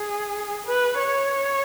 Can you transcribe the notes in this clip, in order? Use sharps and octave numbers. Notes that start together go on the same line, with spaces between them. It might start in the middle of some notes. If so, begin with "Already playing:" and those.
Already playing: G#4
B4
C#5